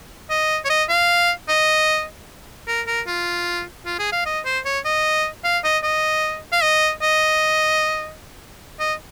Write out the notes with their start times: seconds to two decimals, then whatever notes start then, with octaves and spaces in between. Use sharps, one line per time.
0.30 D#5
0.65 C#5
0.70 D#5
0.89 F5
1.49 D#5
2.68 A#4
2.87 A#4
3.07 F4
3.86 F4
3.99 G#4
4.12 F5
4.26 D#5
4.45 C5
4.65 C#5
4.85 D#5
5.44 F5
5.64 D#5
5.84 D#5
6.52 F5
6.63 D#5
7.02 D#5
8.80 D#5